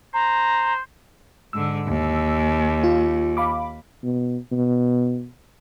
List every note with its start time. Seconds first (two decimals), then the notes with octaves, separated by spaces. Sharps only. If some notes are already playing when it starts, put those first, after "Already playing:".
0.14 C5 A#5
1.53 G#2 D3 E6
1.87 D#2
2.84 F4
3.37 F5 B5 D6
4.03 B2
4.52 B2